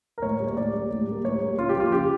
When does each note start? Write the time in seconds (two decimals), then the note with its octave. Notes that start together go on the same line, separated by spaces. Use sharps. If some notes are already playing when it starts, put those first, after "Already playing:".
0.18 A#4
0.22 A2 C#5
0.40 G3 A#3
0.47 C#5
0.57 A2 D5
0.73 G3 A#3
0.91 A2
1.07 G3 A#3
1.24 A2 C#5
1.41 G3 A#3
1.58 C#3 F4
1.69 G4
1.75 F3 A#3 F4
1.92 C#3 G4